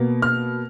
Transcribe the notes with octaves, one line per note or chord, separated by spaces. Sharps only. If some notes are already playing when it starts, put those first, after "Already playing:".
Already playing: B2 A#3
F6